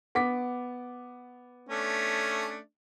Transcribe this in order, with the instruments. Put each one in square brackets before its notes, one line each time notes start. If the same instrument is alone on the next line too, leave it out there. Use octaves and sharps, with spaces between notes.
[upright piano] B3 D6 B6 [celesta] F#5
[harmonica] A3 C#4 D4